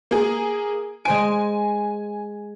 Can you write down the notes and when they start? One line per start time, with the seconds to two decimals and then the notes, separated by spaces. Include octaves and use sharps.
0.11 A#3 G#4
1.05 G#3 C5 G#5 D7